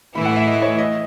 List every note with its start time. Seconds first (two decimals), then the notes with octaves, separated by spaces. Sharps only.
0.15 A2 E3 A3 E4 B5
0.26 F#5
0.36 E5
0.47 D#5
0.62 C#5
0.79 D#5